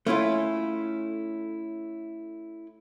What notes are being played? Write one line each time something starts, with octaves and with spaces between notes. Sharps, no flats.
A3 C#4 E4 F4